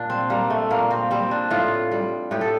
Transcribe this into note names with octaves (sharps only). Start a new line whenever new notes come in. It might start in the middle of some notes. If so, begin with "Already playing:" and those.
Already playing: A#2 D4
C4
G3 A#3
A3
A#2 A#3
C4
G3 C4
D4
A2 F4
G3
A2 G4
A4